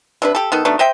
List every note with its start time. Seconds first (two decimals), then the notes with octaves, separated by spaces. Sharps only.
0.22 C3 D4 B4
0.35 G4 A4
0.52 D#3 B3 A4
0.65 B2 A3 D4 D#4
0.79 C5 D#5 E5 G5